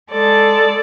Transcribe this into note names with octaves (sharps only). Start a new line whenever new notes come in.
G#3 A4 D5